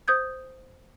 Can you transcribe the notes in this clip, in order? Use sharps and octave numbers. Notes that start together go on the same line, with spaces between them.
C5 D#6 G6 G#6